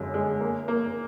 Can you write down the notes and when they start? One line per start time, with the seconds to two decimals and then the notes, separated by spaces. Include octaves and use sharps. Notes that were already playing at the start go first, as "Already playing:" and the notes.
Already playing: G1 F#2 G#3
0.14 G#3
0.41 A#3
0.68 A#3